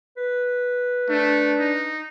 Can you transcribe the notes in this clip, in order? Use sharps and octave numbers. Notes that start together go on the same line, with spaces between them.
B4
A3 D4
D#4